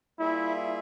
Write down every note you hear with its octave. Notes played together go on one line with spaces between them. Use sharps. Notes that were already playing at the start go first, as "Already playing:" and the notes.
G3 A#3 E4 F4 G#4 E5